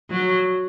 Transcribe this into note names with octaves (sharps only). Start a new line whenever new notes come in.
F#3